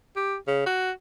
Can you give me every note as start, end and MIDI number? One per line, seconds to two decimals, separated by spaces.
0.16 0.35 67
0.48 0.62 49
0.66 0.91 66